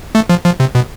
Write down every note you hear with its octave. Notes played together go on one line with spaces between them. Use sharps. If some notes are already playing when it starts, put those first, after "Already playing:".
A3
F3
F3
C3
B2